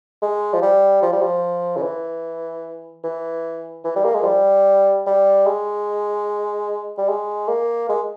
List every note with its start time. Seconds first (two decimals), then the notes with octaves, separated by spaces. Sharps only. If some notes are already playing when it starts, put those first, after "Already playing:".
0.22 G#3
0.54 F3
0.62 G3
1.03 F3
1.12 G3
1.21 F3
1.77 C#3
1.82 E3
3.04 E3
3.85 E3
3.96 G3
4.05 A#3
4.15 G#3
4.22 F3
4.25 G3
5.07 G3
5.47 G#3
6.98 G3
7.09 G#3
7.48 A#3
7.89 G#3